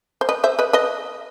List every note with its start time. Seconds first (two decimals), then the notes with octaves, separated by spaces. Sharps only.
0.21 C5
0.29 B4 D#5
0.44 C5 E5
0.59 B4 D#5
0.73 B4 D#5